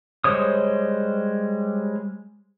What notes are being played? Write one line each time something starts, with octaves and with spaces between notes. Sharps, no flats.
G3 G#3 C5 C#5 D#6